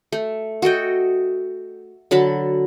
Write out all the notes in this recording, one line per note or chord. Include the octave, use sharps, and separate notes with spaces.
A3
F#4 A4 D#5 G5
D3 F#3 A5 B5